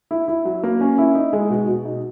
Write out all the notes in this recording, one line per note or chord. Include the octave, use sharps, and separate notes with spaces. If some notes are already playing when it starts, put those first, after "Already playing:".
E4
E4
F#3
A#3
C#4
E4
D#4
G#3
B2
B2
D#4